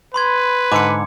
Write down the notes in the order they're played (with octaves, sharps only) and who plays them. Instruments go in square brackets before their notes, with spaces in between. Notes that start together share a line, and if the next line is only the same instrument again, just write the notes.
[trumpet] B4 [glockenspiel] B5 C6 G#6
[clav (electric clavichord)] G#2 D3 [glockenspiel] D6 C#7